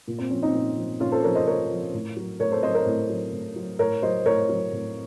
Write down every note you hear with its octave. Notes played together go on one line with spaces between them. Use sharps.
A#2
C4
F3 C#4
C4 D#4
A#2
F3
A#2 C#4 F4
A4 C5
F3 A#4 C#5
C5 D#5
A#2 A#4 C#5
F3
A2
F#3
A2 A#4 C#5
A4 C5
F#3 C5 D#5
A#4 C#5
A2
F#3
A2
F#3
A2 A#4 C#5
F#3 C5 D#5
A2 A#4 C#5
F#3
A2